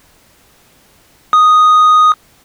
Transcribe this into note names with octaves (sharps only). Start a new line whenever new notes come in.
D#6